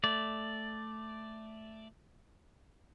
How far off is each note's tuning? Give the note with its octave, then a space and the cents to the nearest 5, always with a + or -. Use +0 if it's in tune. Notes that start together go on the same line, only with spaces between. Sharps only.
A3 +0 D5 +0